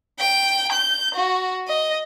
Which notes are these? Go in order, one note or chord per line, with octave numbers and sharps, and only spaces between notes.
G5
G6
F#4
D#5